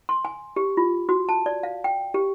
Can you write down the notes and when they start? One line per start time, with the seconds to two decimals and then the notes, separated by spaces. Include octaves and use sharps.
0.09 C6
0.25 G#5
0.56 G4
0.77 F4
1.09 F#4
1.29 A5
1.46 D5
1.63 F5
1.84 G5
2.14 G4